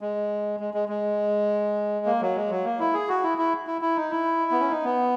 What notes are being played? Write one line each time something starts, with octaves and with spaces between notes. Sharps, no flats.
G#3
G#3
G#3
G#3
A#3
F#3
G#3
F#3
A#3
E4
G#4
F#4
E4
E4
E4
E4
D#4
E4
B3
C#4
D#4
B3